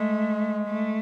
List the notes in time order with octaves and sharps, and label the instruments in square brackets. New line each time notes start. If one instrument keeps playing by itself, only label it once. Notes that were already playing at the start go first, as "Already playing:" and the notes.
Already playing: [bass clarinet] G#3 [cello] A3
[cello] A3